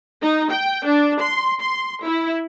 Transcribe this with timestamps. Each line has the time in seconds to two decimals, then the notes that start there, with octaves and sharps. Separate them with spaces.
0.22 D#4
0.51 G5
0.86 D4
1.20 C6
1.61 C6
2.04 E4